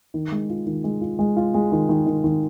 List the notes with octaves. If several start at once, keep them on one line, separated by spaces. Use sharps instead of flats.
D#3
G#3
F4
D#3
G#3
F4
G#3
F4
G#3
D#3
D#3
D#3
D#3